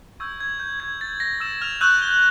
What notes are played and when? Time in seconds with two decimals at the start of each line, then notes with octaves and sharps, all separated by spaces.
0.20 C#6 E6 G6 G#6
0.40 G#6
0.60 G6
0.80 G#6
1.01 A6
1.20 A#6
1.40 E6 E7
1.61 F6 F7
1.81 C#6 E6 F#6 G6 F#7
2.02 G6 G7